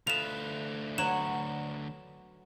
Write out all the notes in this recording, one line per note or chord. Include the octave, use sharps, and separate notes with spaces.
D2 A3 F4 B4 D#5 E7 F7
F#3 B3 F#4 C#5 E7